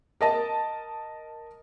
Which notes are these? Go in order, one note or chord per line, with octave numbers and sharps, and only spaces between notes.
A#4 D#5 A5